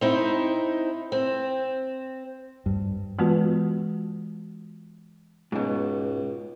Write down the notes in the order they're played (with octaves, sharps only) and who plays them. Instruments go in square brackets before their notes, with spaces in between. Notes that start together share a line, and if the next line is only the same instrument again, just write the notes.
[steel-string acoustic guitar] C4 D#4 E4
C4
[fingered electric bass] G2
[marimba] E3 G#3 B3 F4 F#4 B4
[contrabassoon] C#2 [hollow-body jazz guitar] G#2 B2